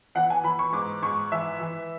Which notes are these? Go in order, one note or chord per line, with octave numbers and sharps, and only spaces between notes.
E3 F#5
G#5
E3 B5
C#6
G#2 D6
G#2 C#6
E3 E5
E3